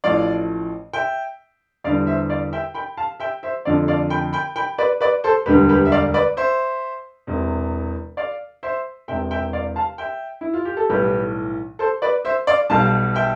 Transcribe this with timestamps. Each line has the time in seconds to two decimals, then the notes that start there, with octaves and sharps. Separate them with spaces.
0.04 A1 A2 F3 D5 F5
0.93 E5 G5
1.84 E2 D3 G3 D5 F5
2.07 C5 E5
2.29 D5 F5
2.53 E5 G5
2.74 G5 B5
2.97 F5 A5
3.20 E5 G5
3.43 C5 E5
3.65 F1 F2 D3 F3 D5 F5
3.88 D5 F5
4.10 G5 B5
4.33 G5 B5
4.56 G5 B5
4.78 B4 D5
5.01 B4 D5
5.24 A4 C5
5.46 E1 D2 D3 G3 G4 B4
5.69 G4 B4
5.85 E5
5.92 D5 F5
6.14 B4 D5
6.37 C5 E5
7.27 E1 E2 C3
8.17 D5 F5
8.63 C5 E5
9.08 E1 E2 C3 E5 G5
9.31 E5 G5
9.53 D5 F5
9.76 F5 A5
9.98 E5 G5
10.41 E4
10.54 F4
10.65 G4
10.77 A4
10.89 B1 A2 E3 G3 G4 B4
11.79 A4 C5
12.02 B4 D5
12.25 C5 E5
12.47 D5 F5
12.70 B1 B2 G3 F5 A5
13.15 E5 G5